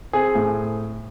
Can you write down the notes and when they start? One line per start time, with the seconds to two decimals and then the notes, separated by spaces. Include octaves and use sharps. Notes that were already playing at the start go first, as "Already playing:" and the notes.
0.13 C4 G#4
0.35 A2